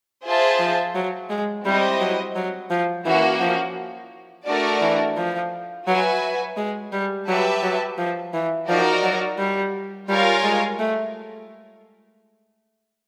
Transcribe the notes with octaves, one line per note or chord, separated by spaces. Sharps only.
F4 G#4 C5 E5 A5
F3
F#3
G#3
G3 C4 E4 G4 C5 D#5
F#3
F#3
F3
E3 A#3 C#4 F#4
F3
A3 D4 F#4 A#4 D5
E3
F3
F#3 F#4 B4 E5 G#5
G#3
G3
F#3 G4 B4 E5 A5
F#3
F3
E3
F3 D#4 F#4 A#4 D5
F#3
G3
G3 F4 A#4 C#5 F5 G#5
G#3
A3